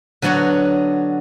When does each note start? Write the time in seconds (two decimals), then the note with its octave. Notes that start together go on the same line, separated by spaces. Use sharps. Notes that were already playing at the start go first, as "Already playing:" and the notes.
0.22 D3 F#3 B3 F#4 C#5 A#5